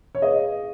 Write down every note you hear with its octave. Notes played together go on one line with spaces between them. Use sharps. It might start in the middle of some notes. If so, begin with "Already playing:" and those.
C#5
G#4 B4 D#5 F5